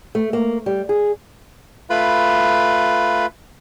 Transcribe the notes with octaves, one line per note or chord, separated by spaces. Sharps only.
A3
A#3
G3
G#4
A3 F4 B4 B5